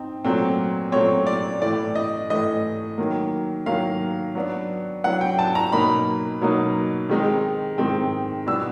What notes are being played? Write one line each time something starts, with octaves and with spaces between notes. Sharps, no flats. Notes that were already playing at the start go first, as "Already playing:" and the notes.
Already playing: C4 D#4
A#2 F#3 A3 C4
A#2 F#3 A3 C4 C#5
D5
A2 E3 A3 D5
D#5
A2 E3 A3 D#5
D#3 F#3 A#3
D#3 F#3 A#3 F5
F#3 B3 D4
F#3 B3 D4 F#5
G5
A5
A#5
B2 F#3 A#3 D#4 B5
B2 F#3 A#3 D#4
D#3 G#3 C4 D#4
D#3 G#3 C4 D#4
B2 G3 B3 D4 E6